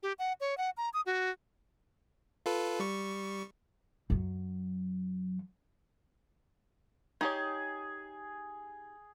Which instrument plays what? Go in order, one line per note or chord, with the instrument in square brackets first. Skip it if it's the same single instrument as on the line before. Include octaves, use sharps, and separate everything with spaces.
[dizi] G4
F#5
C#5
F#5
A#5
D#6
F#4
[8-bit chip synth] F4 A4 B4
G3 C#6
[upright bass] F#2 F#3
[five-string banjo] D#4 G4 C#5 [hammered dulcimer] G#4